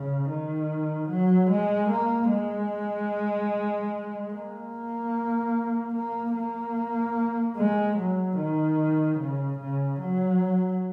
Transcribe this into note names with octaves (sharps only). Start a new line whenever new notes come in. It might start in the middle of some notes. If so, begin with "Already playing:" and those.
Already playing: C#3
D#3
F#3
G#3
A#3
G#3
A#3
A#3
A#3
G#3
F#3
D#3
C#3
C#3
F#3